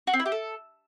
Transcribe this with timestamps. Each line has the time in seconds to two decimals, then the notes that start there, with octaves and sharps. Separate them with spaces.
0.07 F#4
0.13 C4
0.20 E4
0.26 G4
0.32 A4